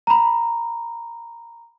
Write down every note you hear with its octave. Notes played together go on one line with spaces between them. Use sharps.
A#5 B5